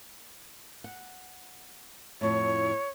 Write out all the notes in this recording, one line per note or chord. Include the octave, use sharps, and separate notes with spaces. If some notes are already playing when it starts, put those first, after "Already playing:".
F#5
F2 A2 C#5